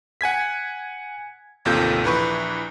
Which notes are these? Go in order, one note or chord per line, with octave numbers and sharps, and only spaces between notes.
F#5 G#5 G#6 B6
A1 D#2 C3 F4 A4 G6
A#1 E3 B4 C#6